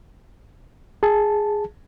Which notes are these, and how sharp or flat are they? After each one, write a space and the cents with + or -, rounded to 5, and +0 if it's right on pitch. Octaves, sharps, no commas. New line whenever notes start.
G#4 +0 A5 +0